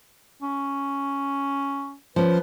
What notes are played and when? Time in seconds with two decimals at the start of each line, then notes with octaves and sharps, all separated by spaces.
0.42 C#4
2.16 F3 C#4 B4